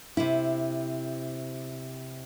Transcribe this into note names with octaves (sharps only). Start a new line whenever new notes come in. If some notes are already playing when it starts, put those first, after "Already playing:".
C3 E4